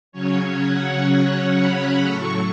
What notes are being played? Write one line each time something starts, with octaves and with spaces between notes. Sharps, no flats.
C#3 F#3 C#4 C#5
F#5
B5
A2 F#3 A3 C#6